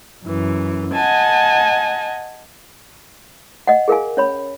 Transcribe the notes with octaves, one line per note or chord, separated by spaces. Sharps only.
F#2 E3
D#5 F#5 G#5 A5
D#5 F#5
G#4 A#4 F5 G#5
C#4 C#5 B5